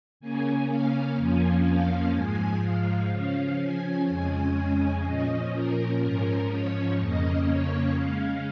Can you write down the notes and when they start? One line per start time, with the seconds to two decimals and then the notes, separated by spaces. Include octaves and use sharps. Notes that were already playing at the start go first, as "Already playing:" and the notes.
0.20 C#3 A#3 C#4 G#5
0.69 F5
1.17 F2 F3 A#3 C#4 G#5
1.66 F5
2.14 G#2 F3 G#3 G#5
2.62 F5
3.10 C#3 F3 C#4 F5
3.60 G#5
4.08 F2 C#3 G#3 C#4 G#5
5.05 A#2 F3 C#4 D#5
5.53 A#4
6.02 G#2 F3 C#4 A#4
6.50 C#5
6.99 F2 C#3 A#3 C#4 D#5
7.47 C#5
7.95 C#3 G#3 C#4 F5